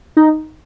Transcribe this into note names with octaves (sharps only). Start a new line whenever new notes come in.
D#4